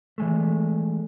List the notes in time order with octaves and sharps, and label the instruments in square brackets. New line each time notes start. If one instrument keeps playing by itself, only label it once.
[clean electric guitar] E3 G#3 A3